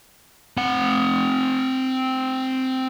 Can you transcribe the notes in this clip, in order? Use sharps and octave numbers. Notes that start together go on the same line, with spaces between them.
C4 F#5